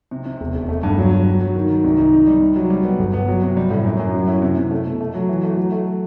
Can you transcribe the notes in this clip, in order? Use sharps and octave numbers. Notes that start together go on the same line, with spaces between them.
C3
C3
E1
E1
A3
G2
F#3
F#3
F#3
F#3
D#3
D#3
C2
D#4
D#4
G3
C3
F#3
G3
B3
G1
B3
F#3
C3
G3
A2
F#2
F#2
F#3
E4
C3
C3
A3
B2
A3
F#3
E3
A3
F#3
A3